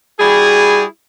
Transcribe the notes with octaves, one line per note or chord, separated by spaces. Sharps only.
G3 E4 F#4 G#4